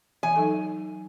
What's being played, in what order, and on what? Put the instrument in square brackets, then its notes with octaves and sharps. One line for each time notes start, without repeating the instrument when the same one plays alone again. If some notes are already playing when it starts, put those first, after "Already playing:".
[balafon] E3 E5 [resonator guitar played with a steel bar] G#5
[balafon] F#3 D#4 A4